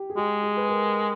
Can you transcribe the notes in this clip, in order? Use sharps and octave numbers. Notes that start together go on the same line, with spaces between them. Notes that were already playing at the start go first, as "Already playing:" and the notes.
Already playing: G4
G#4
G#3 G4
G#4
B4
A#4